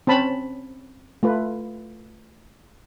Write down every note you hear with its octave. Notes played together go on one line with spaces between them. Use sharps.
C4 C#4 A5 B5
A3 F4 B4